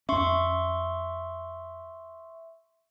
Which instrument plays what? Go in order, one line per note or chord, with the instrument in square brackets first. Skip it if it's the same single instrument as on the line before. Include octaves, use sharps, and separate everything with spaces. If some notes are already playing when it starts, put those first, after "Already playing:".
[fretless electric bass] F2 C#4 [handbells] E5 C6 C#6